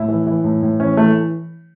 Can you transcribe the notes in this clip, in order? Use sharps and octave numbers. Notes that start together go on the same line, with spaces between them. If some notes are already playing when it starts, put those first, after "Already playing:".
Already playing: A2 E4
E3
E3
A2
A2
E3 C#4
E3 A3